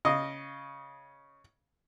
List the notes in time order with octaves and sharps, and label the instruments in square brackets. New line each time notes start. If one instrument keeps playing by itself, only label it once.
[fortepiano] C#3 D#5